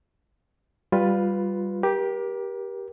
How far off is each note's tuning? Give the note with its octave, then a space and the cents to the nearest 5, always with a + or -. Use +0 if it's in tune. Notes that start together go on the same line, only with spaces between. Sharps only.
G3 +0 F4 +10 B4 +5
G4 +0 A#4 +35